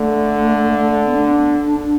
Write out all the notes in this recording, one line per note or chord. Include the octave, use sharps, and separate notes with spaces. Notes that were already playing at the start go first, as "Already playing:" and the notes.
Already playing: D3 A3
B3
D4
D4